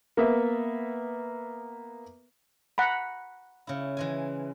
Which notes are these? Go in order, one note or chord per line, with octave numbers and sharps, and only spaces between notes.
A#3 B3 E5
F#5 A#5 B5
C#3 E4
E3 G#3 G#5